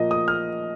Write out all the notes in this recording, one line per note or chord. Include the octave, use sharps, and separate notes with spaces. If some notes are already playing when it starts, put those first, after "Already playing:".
Already playing: A#2 F3 A#3 D#5
D#6
F6